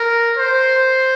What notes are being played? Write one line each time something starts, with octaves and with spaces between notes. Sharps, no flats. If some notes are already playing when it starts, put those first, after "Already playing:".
Already playing: A#4
C5